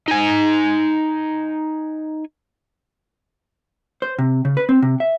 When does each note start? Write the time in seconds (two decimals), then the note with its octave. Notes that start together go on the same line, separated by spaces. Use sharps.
0.08 D#4 G#5
4.02 C5
4.19 C3
4.45 C#3
4.57 B4
4.69 C4
4.82 C3
5.00 E5